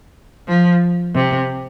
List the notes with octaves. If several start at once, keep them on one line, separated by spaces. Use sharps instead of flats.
F3
C3